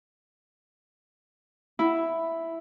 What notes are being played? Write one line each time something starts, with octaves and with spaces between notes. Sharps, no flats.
E4